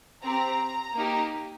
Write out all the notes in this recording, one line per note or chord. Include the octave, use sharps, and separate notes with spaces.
C4 G4 A#5
A#3 D#4 G4